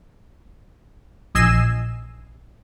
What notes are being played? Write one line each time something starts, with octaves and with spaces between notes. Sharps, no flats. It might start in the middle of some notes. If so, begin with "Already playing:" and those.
A#1 D#5 G#5 E6 C7 E7